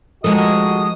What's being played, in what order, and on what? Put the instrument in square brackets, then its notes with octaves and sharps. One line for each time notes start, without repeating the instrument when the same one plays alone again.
[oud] D#2 G#3 A4 [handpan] F3 A#4 [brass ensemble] F#4 D#5 [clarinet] D#6